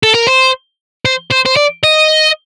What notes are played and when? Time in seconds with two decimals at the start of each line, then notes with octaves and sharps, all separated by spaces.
0.03 A4
0.15 A#4
0.27 C5
1.05 C5
1.31 C5
1.46 C5
1.56 D5
1.83 D#5